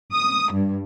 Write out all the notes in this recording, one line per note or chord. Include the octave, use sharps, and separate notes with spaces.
D#6
G2